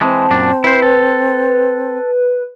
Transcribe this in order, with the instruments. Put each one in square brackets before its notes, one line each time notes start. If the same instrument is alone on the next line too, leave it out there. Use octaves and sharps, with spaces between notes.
[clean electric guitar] E3 G#3 [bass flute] C4 [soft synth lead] A5
[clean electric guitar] F#2 A#2 D4
[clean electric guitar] E4 C5 [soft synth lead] B4
[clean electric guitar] A4